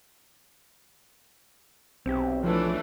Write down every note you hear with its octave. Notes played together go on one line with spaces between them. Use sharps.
B1 C4 G4
E3 F3 A3 D4